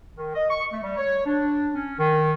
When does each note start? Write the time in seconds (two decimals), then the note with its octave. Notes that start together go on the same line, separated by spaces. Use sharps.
0.17 D#3
0.34 D#5
0.50 C#6
0.71 A3
0.83 G3
0.97 C#5
1.25 D4
1.74 C#4
1.98 D#3